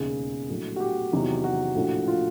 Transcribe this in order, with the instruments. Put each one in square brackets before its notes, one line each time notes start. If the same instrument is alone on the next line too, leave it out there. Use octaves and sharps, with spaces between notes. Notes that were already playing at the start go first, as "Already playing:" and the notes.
Already playing: [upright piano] E1 D#2 C#3 G#4
A#1 A2 F#3
F#4
G4
E2 C3 D#3 F#3
F#4
A#1 A2 F3
F4